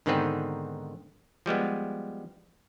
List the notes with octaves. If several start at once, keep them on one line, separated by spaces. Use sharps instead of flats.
G#2 D3 D#3 B3 C4 B4
F3 G3 G#3 B3